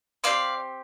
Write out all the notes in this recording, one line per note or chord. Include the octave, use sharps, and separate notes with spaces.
C4 D#4 G4 D5 F5